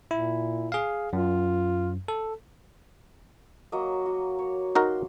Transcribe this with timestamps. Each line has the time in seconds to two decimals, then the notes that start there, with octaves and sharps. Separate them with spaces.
0.11 A#2 E4
0.72 G#4 F5
1.13 F#2 F4
2.08 A4
3.72 F#3 A#3 D#5
4.06 F#4
4.39 C#5
4.75 D#4 F#4 A#4 C6